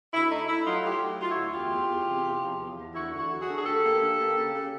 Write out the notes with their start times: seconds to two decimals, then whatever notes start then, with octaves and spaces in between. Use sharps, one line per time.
0.13 D2 E4
0.31 A3 D#4
0.49 A3 E4
0.66 F#3 D#4 F4
0.84 A3 F4 G4
1.02 F#3
1.19 F#3 F4
1.31 E4 F#4
1.37 D2
1.54 E2 F4 G4
1.72 E2
1.90 E2
2.07 C3
2.25 E2
2.42 F3
2.60 E2
2.78 E2
2.95 D2 E4 F#4
3.13 D3
3.18 E4 F#4
3.31 F#3
3.42 F#4 G#4
3.48 D3
3.57 G#4
3.65 D2 G4 A4
3.83 A#3
4.01 D3
4.19 A#3
4.36 C#3
4.54 C#3